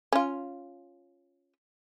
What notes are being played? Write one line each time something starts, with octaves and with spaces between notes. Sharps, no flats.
C#4 F4